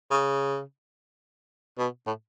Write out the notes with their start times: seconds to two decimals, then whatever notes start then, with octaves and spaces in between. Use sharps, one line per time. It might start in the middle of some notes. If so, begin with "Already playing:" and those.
0.11 C#3
1.78 B2
2.07 A2